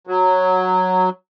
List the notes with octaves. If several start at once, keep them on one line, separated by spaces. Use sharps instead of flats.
F#3